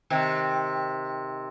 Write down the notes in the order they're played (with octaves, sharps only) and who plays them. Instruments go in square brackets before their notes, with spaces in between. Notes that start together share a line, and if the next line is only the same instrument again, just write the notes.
[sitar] C3 D#3